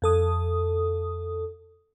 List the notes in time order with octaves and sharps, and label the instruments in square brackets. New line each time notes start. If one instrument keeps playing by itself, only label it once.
[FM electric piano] F2 A4 D#6